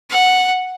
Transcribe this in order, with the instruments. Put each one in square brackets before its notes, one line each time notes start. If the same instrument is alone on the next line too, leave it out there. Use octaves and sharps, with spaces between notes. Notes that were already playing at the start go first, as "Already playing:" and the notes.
[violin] F#5